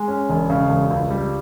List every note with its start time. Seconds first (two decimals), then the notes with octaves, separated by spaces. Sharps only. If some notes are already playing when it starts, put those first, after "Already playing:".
Already playing: G#3
0.08 C#4
0.29 E1
0.50 C#3
0.69 E1
0.90 C#2
1.11 G3